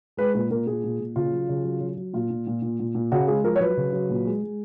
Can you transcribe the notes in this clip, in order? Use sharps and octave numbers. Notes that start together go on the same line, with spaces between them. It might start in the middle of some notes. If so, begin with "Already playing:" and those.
G#3 B4
A#2 B4
A#2 A#4
A#2 G#4
A#2
A#2
C#3 F4
F#3
C#3
F#3
F#3
F#3
A#2 F4
A#2
A#2
A#2
A#2
A#2
C#3 F#4
G#3 G#4
F3 A#4
C#5
F#3 B4
C#3
F#3
A#2
G#3
G#3